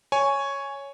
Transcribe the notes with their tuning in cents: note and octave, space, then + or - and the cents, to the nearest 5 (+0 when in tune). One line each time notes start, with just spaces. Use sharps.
C#5 +0 G#5 +0